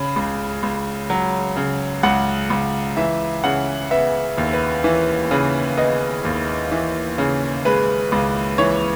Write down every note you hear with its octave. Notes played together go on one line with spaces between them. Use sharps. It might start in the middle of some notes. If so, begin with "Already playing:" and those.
Already playing: C#3 B5
C#2
C#2
F#3
C#3
C#2 F#5
C#2
E3 E5
C#3 F#5
B3 E5
D#2
B4
E3
C#3 B4
B3 D#5
D#2
E3
C#3
G#3 B4
C#2
E3 C#5